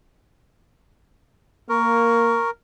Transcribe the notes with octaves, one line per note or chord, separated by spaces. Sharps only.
A#3 A#4 C#6